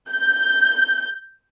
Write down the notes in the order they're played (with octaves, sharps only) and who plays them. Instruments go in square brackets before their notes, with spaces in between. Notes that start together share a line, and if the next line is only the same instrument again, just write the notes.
[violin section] G6